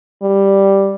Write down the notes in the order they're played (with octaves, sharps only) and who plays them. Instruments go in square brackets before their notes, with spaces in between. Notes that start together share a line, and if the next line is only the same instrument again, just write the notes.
[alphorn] G3